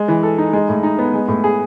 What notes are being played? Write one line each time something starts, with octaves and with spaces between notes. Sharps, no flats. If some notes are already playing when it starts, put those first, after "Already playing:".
Already playing: G#3
E3
A4
D#4
G#3
A2
D#4
B3
G#3
A2
G#4